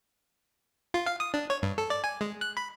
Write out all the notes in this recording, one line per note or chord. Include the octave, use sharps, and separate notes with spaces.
F4
F5
D#6
D4
C#5
G2
A4
D5
G#5
G#3
F#6
B5